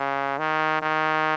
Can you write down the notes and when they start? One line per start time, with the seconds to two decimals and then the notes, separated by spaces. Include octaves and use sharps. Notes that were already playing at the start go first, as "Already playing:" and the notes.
Already playing: C#3
0.39 D#3
0.82 D#3